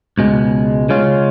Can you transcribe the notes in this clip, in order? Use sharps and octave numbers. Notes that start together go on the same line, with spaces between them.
C#2 B2 G#3
C#3 G#3 C#4 F4